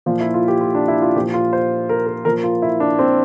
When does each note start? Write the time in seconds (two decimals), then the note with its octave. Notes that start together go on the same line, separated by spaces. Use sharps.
0.06 A#2 F3 F4
0.20 E4
0.34 F4
0.48 G4
0.61 F4
0.75 D4
0.88 E4
1.02 F4
1.16 A#2 G4
1.19 F3
1.34 F4
1.53 C5
1.89 A#4
2.06 A#4
2.25 A#2 F3 A#4
2.44 F4
2.62 E4
2.80 D4
2.99 C4